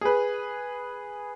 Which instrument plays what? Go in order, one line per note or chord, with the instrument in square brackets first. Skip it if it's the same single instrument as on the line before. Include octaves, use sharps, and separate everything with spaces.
[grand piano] G#4 B4